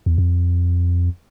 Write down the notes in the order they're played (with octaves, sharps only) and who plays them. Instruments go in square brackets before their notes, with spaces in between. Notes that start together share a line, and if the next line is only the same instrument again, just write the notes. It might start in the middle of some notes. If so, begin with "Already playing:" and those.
[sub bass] E2
F2